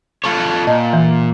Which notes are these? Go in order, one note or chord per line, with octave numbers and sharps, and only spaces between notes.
F4 A4 C#5
A#2 D#5 A5
E3